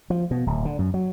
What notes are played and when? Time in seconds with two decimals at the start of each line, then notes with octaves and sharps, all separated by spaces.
0.10 F3
0.31 B2
0.47 D1
0.65 D3
0.79 F#2
0.94 F#3